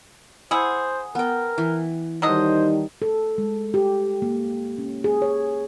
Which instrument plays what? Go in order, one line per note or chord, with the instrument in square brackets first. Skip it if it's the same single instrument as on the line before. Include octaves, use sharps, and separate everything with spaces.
[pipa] E4 G#4 [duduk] C5 [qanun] F#5
[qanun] B3 G5 [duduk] A#4
[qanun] E3
[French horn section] D#3 G3 D#4 [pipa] F#3 A4 D#5 [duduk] C5
[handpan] A4
G#3
G4
A#3
C#4
G#4
C#5